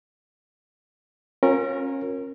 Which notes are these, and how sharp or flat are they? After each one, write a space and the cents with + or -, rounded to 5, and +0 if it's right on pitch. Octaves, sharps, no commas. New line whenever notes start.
C#4 -25 F4 +40 A#4 +0